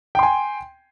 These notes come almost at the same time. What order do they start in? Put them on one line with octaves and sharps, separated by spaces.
G5 C6 G#5